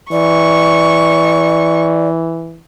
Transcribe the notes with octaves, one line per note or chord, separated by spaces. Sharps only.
E3 D5 C#6